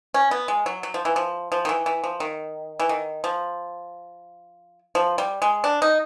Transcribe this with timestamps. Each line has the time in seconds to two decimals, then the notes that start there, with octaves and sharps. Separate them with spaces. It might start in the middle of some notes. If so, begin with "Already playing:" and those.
0.14 C#4
0.31 B3
0.48 G#3
0.66 F#3
0.83 F#3
0.94 F3
1.05 E3
1.16 F3
1.52 F3
1.65 D#3
1.69 E3
1.86 E3
2.04 F3
2.20 D#3
2.80 E3
2.89 D#3
3.24 F3
4.95 F3
5.18 G3
5.42 G#3
5.64 D4
5.82 D#4